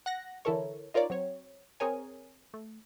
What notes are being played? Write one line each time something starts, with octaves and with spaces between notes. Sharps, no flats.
F#5 F#6 A#6
D3 E3 E4 A4 A#4 C#5
D#4 F4 A#4 C#5 D5
F#3 C4 C#5
C4 G#4 A#4 C#5 G#5
A3